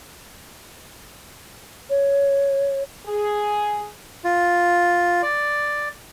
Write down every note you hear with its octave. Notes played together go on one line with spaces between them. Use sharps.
C#5
G#4
F4
D5